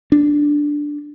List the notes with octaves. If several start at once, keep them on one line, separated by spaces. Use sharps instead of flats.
D4